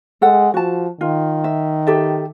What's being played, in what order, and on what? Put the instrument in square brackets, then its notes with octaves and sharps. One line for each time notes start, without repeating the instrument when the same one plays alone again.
[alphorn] G#3 [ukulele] A4 F#5
[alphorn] F3 [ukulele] F#4 A5
[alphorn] D#3 [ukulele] F4
[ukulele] E5
G4 A4 E5